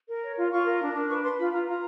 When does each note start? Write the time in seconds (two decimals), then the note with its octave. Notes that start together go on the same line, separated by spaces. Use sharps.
0.09 A#4
0.23 C#5
0.37 F4
0.51 F4 C#6
0.66 A#4
0.80 D4
0.95 D4
1.10 B4 C#6
1.24 B4 C6
1.39 F4 B5
1.53 F4 A#5
1.68 F4 A#5